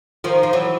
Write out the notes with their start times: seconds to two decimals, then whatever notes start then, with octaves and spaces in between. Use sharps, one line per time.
0.24 D#3 F3
0.43 F3
0.53 E3 F#3